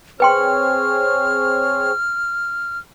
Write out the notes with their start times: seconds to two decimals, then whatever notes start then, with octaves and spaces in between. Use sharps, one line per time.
0.20 C4 G#4 B4 C#5 G5 C6 F6